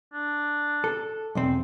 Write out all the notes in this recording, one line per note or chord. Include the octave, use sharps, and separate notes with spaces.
D4
A4
B1 E2 C4